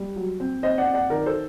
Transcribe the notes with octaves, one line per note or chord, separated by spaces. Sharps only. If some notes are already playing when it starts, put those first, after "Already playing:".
Already playing: G3
F#3
C4
C4 C5 D#5
D5 F#5
C4
D5 F#5
D#3 A#4 D5
A4 C5